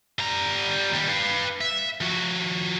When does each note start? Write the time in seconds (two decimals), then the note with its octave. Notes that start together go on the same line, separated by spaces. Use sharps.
0.19 G3 A#5
0.93 D#2 G3
1.09 B4 F5
1.61 E5
2.01 F3 F#4